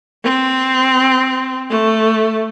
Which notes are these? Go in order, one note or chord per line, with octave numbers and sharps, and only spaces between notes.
C4
A3